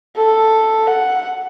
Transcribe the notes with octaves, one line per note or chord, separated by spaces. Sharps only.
A4
F#5